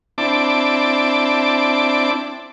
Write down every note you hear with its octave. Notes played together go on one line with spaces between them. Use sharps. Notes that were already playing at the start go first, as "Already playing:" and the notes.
C4 D4 E4 A5 D6